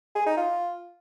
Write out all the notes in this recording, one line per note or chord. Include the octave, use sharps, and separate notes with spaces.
G#4
D#4
F4